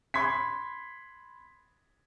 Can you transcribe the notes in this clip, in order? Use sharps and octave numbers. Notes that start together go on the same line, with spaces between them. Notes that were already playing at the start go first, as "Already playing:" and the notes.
B5 C6 G#6 B6